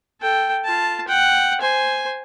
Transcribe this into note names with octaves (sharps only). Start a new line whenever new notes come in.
A4 G5
F4 A5
F#5 G5
C5 G#5